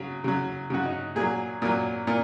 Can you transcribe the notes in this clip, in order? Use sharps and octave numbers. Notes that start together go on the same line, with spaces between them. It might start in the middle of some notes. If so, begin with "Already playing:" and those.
Already playing: C#3 F#3
C#3 F#3
C#3 F#3 F#4
D#4
A#2 F#3 G#4
A#2 F#3
A#2